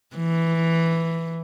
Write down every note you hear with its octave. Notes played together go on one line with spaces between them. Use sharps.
E3